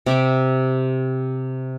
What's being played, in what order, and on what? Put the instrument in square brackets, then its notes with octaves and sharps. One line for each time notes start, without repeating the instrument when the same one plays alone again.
[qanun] C3 G4 E5 D6